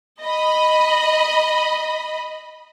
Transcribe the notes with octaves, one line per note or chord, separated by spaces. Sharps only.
D#5 B5